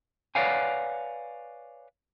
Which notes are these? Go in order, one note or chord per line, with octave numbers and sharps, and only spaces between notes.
B4 C#5 D5 F5 F#5 G#5